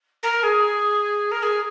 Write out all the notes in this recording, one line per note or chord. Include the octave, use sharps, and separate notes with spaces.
A#4
G#4
A#4
G#4